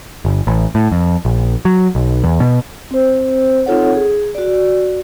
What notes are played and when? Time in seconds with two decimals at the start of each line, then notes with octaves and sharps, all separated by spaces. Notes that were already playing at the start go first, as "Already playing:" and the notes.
0.25 G1
0.47 A1
0.75 A2
0.92 F2
1.25 A#1
1.65 F#3
1.95 B1
2.24 E2
2.40 B2
2.91 C4 C5
3.66 C4 D#4 F4 A4 C#5 F#5
3.95 G#4
4.35 F#4 D5